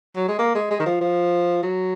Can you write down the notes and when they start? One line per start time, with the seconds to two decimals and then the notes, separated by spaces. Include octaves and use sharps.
0.16 F#3
0.28 G#3
0.39 A#3
0.55 G#3
0.71 G#3
0.80 D#3
0.86 F3
1.01 F3
1.63 F#3